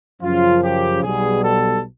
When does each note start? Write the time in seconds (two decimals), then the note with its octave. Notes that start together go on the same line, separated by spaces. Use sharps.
0.22 F#2 C#3 F3 F4
0.63 G4
1.03 B1 B2 G3 G#4
1.43 A4